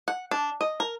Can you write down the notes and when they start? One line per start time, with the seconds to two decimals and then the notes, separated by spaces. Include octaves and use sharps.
0.08 F#5
0.31 D4
0.61 D#5
0.80 A#4